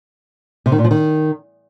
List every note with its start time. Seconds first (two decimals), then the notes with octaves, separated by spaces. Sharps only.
0.66 C3
0.72 D#3
0.78 A#2
0.85 F3
0.91 D#3